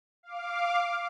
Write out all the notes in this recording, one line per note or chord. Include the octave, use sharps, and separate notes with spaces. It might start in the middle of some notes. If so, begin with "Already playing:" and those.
F5 D6